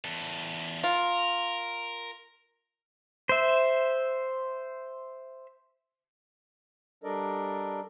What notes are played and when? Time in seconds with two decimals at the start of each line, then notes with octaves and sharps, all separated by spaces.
0.05 E2 A4
0.84 F4 A#4
3.29 C5 E5
7.04 G3 D4 A4 A#4 D5 D#5